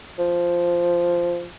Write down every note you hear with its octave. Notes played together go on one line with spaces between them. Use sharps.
F3